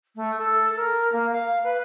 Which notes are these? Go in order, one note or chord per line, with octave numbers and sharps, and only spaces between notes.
A3
A4
A#4
A#3
F5
B4